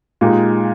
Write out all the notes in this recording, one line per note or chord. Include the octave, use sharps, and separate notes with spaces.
A#2 G#3 D#4 G4